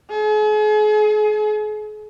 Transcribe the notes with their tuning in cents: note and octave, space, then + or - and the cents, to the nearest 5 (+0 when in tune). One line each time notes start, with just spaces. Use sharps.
G#4 +40